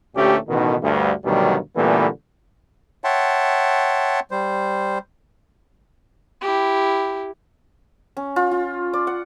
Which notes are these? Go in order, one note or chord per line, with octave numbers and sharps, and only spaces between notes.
D2 A#2 A3 C#4 G4
A1 B2 D#3
D2 G2
D2 G2 B2 D#3 F#3 G3
A#2 D3 E3 G3 A3 B3
C#5 E5 F#5 G5 A5 C6
G3 C5
E4 G4
C#4
F4
F4
D5
F#5